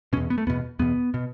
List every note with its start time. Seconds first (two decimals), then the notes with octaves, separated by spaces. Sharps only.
0.13 B2 C#4
0.17 E2
0.30 B3
0.38 A3
0.47 E2 B2 B3
0.79 E2 B2 B3
1.14 B2